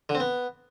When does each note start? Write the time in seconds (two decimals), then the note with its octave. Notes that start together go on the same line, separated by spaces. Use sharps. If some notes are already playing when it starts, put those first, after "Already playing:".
0.09 D3
0.15 C4
0.20 B3